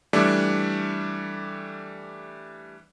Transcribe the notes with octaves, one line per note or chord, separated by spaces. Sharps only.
E3 G3 A3 D4